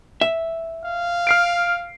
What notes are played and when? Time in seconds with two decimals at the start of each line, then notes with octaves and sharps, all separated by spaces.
0.21 E5
0.84 F5
1.27 F6 C7 D7